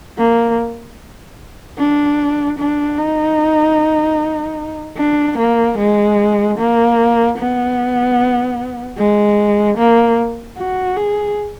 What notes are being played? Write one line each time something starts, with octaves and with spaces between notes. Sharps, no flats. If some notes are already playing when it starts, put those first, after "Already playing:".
A#3
D4
D4
D#4
D4
A#3
G#3
A#3
B3
G#3
A#3
F#4
G#4